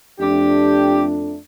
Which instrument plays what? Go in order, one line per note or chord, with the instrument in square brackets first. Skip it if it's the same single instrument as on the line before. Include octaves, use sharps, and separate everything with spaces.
[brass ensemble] F2 A3 D4 [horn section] G4